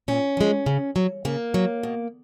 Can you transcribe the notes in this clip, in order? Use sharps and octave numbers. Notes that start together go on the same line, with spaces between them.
A#2 C#4
F3 G#3
C#3
F#3
C#3 A#3
F#3
B2